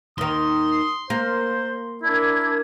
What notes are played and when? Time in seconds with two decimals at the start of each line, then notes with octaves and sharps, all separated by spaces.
0.18 D#2 D#3 C6 D#6
1.10 A#3 C5
2.02 D4 E4 A#4 G#6